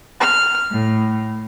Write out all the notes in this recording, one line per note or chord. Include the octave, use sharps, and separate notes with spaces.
F6
A2